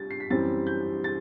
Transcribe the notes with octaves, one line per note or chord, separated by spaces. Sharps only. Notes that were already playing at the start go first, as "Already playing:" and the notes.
Already playing: G3 A6
C7
B6
F#2 E3 G3 C4 A6
G6
A6